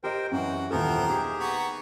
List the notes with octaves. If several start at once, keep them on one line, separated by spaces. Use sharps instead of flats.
G4 A#4 C5 D#5 G5
F#2 E3 F#4
D#1 E3 F3 B3 A4 A#4 C5 G5
D#4 G4 G#4
B3 A#5 C#6